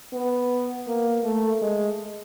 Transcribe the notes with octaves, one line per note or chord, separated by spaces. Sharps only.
B3
A#3
A3
G#3